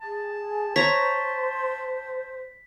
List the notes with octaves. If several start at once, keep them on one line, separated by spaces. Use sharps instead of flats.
G#4 A5
C5 C#5 A#5 B6